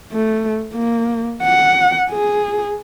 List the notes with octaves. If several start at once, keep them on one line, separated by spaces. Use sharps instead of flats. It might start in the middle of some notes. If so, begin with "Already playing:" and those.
A3
A#3
F#5
G#4